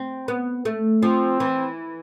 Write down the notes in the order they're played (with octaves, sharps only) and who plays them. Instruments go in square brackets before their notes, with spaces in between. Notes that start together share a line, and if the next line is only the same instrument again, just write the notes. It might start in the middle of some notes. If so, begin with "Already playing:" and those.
Already playing: [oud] C4
B3
A3
[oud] F3 [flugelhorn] C4
[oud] E3